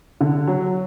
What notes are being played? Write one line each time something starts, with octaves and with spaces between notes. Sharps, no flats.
D3
F#3